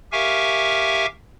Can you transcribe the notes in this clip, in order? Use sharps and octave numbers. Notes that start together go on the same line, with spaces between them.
G4 A#4 E5 F5 G#5 C#6